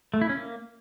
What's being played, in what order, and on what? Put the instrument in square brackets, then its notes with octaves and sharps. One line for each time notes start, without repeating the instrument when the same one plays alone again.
[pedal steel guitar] A3
E4
C#4
A#3